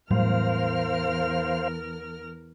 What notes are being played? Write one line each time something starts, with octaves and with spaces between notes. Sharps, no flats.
E2 A2 F#3 G3 A#4 C5 F5 F6